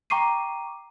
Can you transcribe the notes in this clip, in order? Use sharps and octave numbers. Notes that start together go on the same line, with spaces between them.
G5 A#5 C#6 D6 C7 D#7